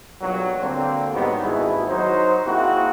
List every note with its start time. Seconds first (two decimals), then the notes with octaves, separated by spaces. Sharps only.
0.21 B1 G2 A#2 F#3
0.62 D3 A#3 C4
1.12 G#2 D#3 F#3 G3 B3
1.43 G#1 D#2 B2 E4 G#4
1.89 F#3 D#4 C5
2.47 A#3 C4 E4 F#4 G#4